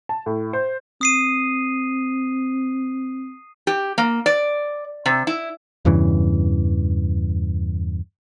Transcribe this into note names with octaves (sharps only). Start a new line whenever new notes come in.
A5
A2
C5
C4 D#6 C7 D#7
G4
A#3
D5
C3
E4
E2 G2 C#3 E3